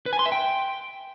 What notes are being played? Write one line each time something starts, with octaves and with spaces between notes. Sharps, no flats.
B4
G#5
C6
E5
G5